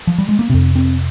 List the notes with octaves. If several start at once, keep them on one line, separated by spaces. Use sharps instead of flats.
F3
G3
G#3
A#3
F2 C3 C4
C4